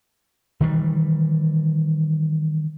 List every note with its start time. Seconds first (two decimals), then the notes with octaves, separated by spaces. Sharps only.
0.61 D#3 E3 G3